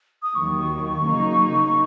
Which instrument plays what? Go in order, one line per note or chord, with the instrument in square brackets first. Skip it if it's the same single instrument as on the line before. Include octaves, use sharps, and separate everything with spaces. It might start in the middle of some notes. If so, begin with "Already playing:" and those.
[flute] D#6
[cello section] D#2 D#3 F#3 [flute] C#6
[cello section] C#3 F#3 A#3 D#4